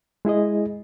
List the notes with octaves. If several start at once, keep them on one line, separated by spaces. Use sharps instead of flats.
G#3 E4 G#4 D#5